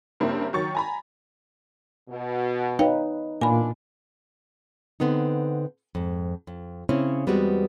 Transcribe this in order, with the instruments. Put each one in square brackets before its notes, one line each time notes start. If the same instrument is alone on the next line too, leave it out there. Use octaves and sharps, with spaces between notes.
[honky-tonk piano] G2 C#3 A#3 C4 E4
D#3 F#3 C#6 A6
G#5 A#5 B5
[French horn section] B2
[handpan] D#4 B4 [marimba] C#5 F5 G5
[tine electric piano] A#2 A#3 F4 [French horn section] E3 B3 D4 [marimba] G#5 B5
[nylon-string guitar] D3 B3 C4 D#4
F2 G#2
F2
C#3 C4 C#4 E4
E2 G3 G#3 B3 C4 F#4